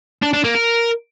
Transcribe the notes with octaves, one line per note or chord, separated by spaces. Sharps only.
D4
D4
A#3
A#4